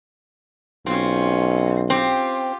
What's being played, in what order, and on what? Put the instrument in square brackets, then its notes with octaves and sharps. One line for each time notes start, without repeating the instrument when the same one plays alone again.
[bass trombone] B1 [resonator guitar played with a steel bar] C4 [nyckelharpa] C#4 F4
[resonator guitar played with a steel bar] C4 [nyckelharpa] F4 G4